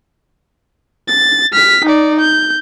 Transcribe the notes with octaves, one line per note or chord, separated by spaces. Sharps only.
A6
F6 B6
D#4 D5
G6